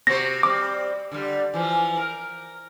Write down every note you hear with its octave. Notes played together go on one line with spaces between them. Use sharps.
C3 F#4 C5 A#6
G3 C4 D6
D3 G3
E3 F3
A#4